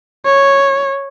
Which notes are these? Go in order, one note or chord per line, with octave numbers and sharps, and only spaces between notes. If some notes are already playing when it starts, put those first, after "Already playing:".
C#5